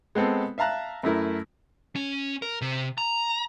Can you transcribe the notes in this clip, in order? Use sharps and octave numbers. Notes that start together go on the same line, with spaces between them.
G#3 B3 C4 A4
E5 F5 A5 A#5 F#6
F#2 A3 E4 A#4
C#4
A#4
C3
A#5